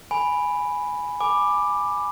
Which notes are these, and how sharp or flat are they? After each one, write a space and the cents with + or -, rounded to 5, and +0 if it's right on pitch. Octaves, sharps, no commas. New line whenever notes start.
G#5 +0 B5 +0
G#5 +0 B5 +0 D6 +10